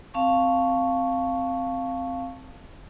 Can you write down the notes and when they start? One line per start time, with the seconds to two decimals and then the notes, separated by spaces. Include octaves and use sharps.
0.14 C4 F5 A5 C#6